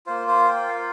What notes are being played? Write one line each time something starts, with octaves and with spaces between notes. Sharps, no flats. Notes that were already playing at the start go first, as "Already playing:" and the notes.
A#3 F4 C5
C5
G5
F5